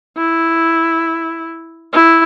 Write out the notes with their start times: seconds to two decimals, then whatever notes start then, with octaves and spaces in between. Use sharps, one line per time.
0.17 E4
1.93 E4